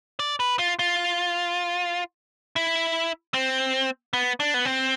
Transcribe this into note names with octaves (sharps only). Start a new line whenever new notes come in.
D5
B4
F4
F4
E4
C4
B3
D4
B3
C4